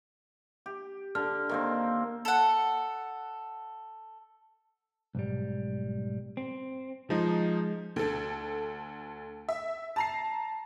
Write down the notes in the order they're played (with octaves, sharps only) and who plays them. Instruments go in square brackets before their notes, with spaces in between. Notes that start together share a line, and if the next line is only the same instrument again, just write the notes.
[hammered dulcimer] G4
[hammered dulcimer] D3 [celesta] F6
[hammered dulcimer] D#3 A#3 C4
[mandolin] A4 F#5
[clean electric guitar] B1 G#2 G3
C4
[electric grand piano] F3 D#4 [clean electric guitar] G#3
[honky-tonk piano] D2 A4
E5
A5 A#5 C7